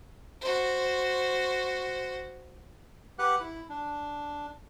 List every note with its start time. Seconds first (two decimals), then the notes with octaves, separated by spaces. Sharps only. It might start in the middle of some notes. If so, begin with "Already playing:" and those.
0.41 F#4 C5
3.19 G4 B4 F#5 F#6
3.40 E4
3.69 D4